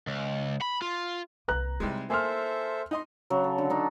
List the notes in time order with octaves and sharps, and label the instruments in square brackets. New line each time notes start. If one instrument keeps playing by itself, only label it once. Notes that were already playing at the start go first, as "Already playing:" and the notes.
[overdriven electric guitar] C#2
B5
F4
[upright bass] C2 A#3 [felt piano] B4 A#5 F#6
[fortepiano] C3 G3 G#3 [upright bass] D#4 E4
[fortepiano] A#3 [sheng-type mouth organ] A4 C5 E5 [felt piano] G#5 C6 F6
[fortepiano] D#4 D#5 C6
[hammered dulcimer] C#3 F#3
A4
D3
D4 D#4 D5